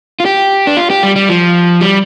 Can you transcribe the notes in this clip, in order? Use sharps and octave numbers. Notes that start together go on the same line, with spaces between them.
F4
G4
D4
F4
G4
G3
G3
F3
G3